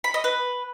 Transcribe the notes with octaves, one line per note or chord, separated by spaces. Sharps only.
B5
D#5
B4